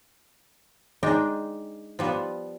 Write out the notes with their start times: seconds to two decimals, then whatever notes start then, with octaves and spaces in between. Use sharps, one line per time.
1.03 G#3 D4 D#4 G5
1.99 F3 G3 B3